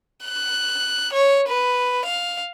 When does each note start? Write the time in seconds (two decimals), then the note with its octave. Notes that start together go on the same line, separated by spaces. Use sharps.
0.24 F#6
1.13 C#5
1.48 B4
2.05 F5